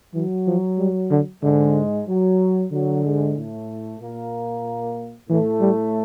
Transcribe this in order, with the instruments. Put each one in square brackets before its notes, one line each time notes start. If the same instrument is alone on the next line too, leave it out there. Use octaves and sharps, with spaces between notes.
[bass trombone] E3 [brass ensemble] F#3
[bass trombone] F3
G3
D3
[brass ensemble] G#2 G#3 [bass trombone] D3
[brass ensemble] F#3
[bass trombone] D3 [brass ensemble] F#3
[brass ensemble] G#2 G#3
A2 A3
A#2 A#3
[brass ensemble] A2 A3 [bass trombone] E3
[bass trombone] G3